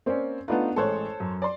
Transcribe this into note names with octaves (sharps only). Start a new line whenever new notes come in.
A#3 C4 C#4 C5 D5
A3 B3 D4 D#4 F4 B4
A1 G#3 A4 C5 C#5 F#6
F#2
D5 C6